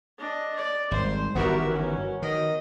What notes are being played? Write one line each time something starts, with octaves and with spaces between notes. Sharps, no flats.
D4 D#5
D5
G#1 G3 C5
G1 D#3 E3 B3 F#4 G4 A#4 E5
C#4
D#3 D#5